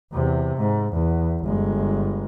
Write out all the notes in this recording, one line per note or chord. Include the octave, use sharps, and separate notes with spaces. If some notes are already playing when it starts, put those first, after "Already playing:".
E2 C3
G#2
E2
G1 G#3